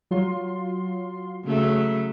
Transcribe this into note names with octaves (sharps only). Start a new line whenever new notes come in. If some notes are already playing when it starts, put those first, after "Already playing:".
F#3 F4 C6
C#3 F#3 A3